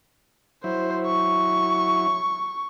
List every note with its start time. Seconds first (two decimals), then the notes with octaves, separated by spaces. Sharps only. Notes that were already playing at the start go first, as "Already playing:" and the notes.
0.64 F#3 E4 C5
1.06 C#6